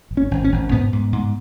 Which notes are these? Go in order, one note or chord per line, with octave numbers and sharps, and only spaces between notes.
G#1
C#4
G#1
C#4
G#1
G#2 B3
G#2
G#2